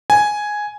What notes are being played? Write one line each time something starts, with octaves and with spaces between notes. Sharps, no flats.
G#5